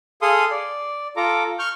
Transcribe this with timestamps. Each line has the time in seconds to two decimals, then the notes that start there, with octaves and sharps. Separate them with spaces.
0.22 G#4 A4 F5 C6 D#6
0.51 D5
1.16 F4 A4 A#5 D6
1.59 C#6 F6 G6